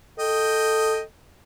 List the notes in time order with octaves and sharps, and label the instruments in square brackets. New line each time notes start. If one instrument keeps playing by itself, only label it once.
[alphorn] A4 [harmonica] D#5 G5